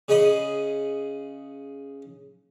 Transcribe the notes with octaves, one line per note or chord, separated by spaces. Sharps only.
C#3 G#4 D#5 B5 D#6